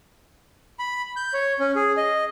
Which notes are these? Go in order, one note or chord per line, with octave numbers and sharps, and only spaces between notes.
B5
G6
C#5
C#4
G#4
D#5